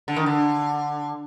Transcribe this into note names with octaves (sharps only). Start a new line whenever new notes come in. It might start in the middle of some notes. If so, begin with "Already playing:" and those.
D3
D#3
D3